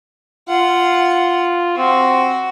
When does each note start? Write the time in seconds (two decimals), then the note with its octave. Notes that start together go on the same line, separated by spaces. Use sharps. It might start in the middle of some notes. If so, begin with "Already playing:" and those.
0.49 F4 F#5
1.77 C4 F#4